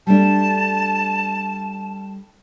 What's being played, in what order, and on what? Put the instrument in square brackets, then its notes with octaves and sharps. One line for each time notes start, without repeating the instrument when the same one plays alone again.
[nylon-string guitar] G3 A3 D4 [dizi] A5